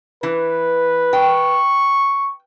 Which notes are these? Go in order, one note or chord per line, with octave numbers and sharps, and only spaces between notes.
E3 B4
G5 C#6